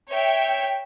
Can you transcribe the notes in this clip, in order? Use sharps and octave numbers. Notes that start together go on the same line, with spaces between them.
C#5 E5 G5